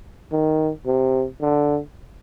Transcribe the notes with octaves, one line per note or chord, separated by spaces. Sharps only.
D#3
C3
D3